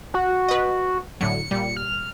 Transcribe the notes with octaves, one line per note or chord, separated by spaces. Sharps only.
F#4
B4 D#5
A2 D3 F#3 C#7
A#2 G3
F6